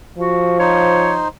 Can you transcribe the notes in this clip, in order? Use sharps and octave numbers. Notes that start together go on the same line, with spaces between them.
F3 F#4
D#4 C5 C#5